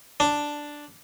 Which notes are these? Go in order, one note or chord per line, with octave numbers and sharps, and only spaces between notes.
D4